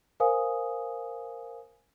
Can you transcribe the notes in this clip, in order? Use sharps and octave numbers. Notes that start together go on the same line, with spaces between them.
A#4 C5 F5 G#5 D#6